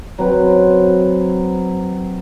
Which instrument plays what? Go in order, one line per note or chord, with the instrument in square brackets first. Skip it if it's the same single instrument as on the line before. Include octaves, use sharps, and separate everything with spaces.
[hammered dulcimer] F#3 C4 B4